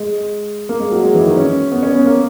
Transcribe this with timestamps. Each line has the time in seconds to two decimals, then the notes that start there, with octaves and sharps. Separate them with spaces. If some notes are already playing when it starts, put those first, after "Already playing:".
Already playing: G#3
0.69 A#3
0.80 G#3
0.91 F#3
1.03 G#3
1.15 E3
1.26 D#3
1.37 C#4
1.72 B3
1.83 C#4
1.95 B3
2.06 A#3